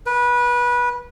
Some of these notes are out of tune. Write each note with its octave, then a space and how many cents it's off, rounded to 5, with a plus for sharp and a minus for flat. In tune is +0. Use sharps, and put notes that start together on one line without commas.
B4 -20